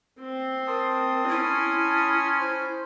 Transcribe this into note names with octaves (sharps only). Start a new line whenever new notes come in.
C4
A#4 A5 C6 D#6
C#4 E4 G#5
E4 C5